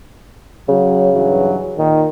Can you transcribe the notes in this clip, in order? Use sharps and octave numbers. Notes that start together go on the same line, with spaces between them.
C#3 F#3
G2 E3 F#3
A#2 D#3